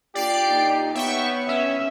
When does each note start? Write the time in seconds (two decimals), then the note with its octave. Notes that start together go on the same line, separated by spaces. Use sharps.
0.15 A#3 D4 F4 G4 D5 C7 D7
0.48 A#2 D#4
0.95 B3 C#5 E5 G5 C#6
1.49 C#4 E5